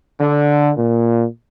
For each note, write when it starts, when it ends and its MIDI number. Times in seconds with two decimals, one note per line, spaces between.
0.21 0.71 50
0.78 1.25 46